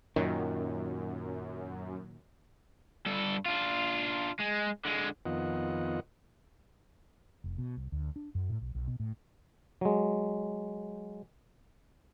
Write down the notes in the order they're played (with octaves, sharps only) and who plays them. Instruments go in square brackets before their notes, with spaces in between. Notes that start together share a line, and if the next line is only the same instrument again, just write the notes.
[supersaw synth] F#2 [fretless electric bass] A#2 D#3
[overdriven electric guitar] G2 A4
D4 F4
G#3
D3 G#3
[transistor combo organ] F2 D#3 B3 F4 D#5 F#5
[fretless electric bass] F1
B2
C2
D2
D4
F#2
A2
B1
B1
B2
A2
[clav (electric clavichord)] F#3 G#3